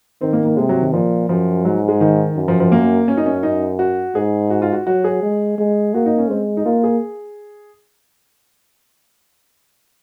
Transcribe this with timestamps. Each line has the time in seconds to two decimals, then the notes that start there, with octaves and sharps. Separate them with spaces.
0.21 D#3 C4
0.33 A#3
0.45 A#3
0.57 C3 G#3
0.69 F#3
0.81 D#3
0.93 A#2 F3
1.29 F#2 F3
1.65 G#2 F#3
1.88 G#3
2.01 D#3
2.37 F#2
2.48 F3
2.60 F3
2.72 A#3
3.08 F#2 C#4
3.17 D#4
3.26 C#4
3.43 D#4
3.79 F#4
4.15 G#2 G#4
4.50 F#4
4.62 F4
4.72 F#4
4.87 F#3 F#4
5.04 G#4
5.22 G#3
5.58 G#3
5.94 A#3 F#4
6.06 D#4
6.18 C#4
6.29 G#3 C4
6.57 D#4
6.65 A#3 F4
6.84 G#4